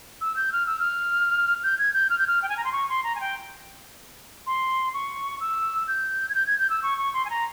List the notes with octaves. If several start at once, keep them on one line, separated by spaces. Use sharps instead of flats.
E6
G6
F6
E6
F6
G6
G#6
G6
F6
G6
F6
G5
G#5
A#5
C6
C#6
C6
A#5
G#5
G5
C6
C#6
E6
G6
G#6
G6
G#6
G6
E6
C#6
C#6
C6
G#5
A#5